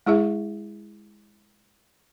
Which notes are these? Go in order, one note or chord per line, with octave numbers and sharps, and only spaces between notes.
G#3 E4 G#4 E5